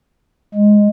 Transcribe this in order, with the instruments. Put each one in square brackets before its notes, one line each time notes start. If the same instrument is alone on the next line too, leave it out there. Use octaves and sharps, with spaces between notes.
[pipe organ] G#3